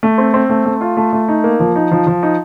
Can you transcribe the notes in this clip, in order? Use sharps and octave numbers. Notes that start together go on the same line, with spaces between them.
A3
C4
C4
A3
A3
F4
A3
A3
D#4
A#3
F3
D#4
F3
F3
D#4